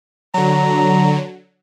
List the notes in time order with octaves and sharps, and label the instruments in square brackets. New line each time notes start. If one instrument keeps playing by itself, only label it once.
[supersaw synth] D3 F#3 [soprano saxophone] A#5